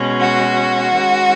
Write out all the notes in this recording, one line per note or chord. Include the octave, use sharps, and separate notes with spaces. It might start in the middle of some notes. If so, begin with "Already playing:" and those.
Already playing: B2 G#3 C#4
F#4
D#3 G#3 C#4